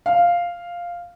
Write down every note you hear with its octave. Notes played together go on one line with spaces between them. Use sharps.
F5